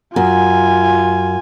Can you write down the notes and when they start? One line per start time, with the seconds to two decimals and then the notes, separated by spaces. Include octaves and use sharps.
0.16 F#2 F4 G#5